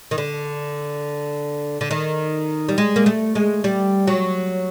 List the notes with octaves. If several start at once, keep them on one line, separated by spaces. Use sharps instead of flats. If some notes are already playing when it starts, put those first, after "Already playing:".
D#3
D3
D3
D#3
G3
G#3
A#3
A3
G#3
G3
F#3